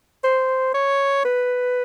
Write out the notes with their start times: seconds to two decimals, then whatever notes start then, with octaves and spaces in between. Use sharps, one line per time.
0.24 C5
0.74 C#5
1.25 B4